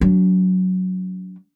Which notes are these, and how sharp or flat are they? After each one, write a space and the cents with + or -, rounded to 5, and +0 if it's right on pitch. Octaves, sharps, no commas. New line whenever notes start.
F#3 +0 D4 -40